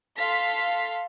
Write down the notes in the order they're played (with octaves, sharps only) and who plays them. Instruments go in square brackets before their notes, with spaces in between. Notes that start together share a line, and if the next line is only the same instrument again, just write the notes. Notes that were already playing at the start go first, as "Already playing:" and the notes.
[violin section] A4 F5 C6 B6